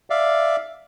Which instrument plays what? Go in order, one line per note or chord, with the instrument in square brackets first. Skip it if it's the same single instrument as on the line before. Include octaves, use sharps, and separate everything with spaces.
[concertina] D5 E5 F5